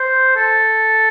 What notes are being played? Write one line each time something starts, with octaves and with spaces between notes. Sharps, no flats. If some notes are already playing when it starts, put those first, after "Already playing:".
Already playing: C5
A4